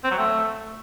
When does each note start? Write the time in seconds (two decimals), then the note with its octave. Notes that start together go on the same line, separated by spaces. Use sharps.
0.04 C4
0.11 F#3
0.18 A3